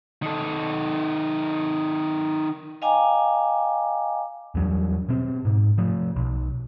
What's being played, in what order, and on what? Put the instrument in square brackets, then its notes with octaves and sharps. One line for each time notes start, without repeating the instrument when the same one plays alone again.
[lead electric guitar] D#3 A4
[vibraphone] D#5 F5 G5 G#5 A#5 D6
[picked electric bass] E2 F#3 G3
B2 C4
G#2
F3 A3
B1